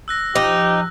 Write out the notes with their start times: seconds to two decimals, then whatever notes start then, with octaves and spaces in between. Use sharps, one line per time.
0.08 E6 F#6 A#6
0.35 F3 D#4 G4